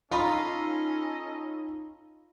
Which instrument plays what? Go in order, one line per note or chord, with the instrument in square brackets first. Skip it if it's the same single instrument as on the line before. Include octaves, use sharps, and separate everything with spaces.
[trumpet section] C#4 A4 D#5 [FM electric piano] D#4 [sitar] F4 [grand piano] A#5 B5 C#6